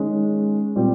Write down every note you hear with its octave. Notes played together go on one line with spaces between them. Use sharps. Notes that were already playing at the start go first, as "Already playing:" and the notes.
Already playing: D#3 G#3 C#4
A#2 G3 C4